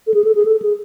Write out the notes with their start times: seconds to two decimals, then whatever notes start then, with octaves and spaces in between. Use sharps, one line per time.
0.07 A4
0.14 G#4
0.24 A4
0.35 G#4
0.45 A4
0.62 G#4